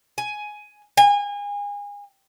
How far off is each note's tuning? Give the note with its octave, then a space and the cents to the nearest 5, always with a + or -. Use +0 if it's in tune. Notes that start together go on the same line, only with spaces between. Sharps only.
G#5 +10
G#5 -30